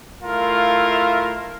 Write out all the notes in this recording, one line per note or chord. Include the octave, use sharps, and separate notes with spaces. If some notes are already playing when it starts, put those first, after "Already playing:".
A3 E4 F4 A#4 F5